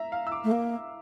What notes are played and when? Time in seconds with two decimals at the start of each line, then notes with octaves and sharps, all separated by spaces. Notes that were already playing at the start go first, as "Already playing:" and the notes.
Already playing: E5 A#5
0.12 F5
0.27 E6
0.32 D6
0.44 A3
0.51 A#3